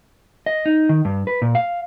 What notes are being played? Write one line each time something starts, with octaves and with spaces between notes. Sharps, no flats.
D#5
D#4
D#3
G2
B4
A#2
F5